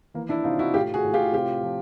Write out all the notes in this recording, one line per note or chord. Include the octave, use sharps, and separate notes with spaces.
E3 A#3
D4 E4
C3 D#4 F4
E4 F#4
A2 F4 G4
F#4 G#4
A2
F4 G4
C3 F4 G4
F3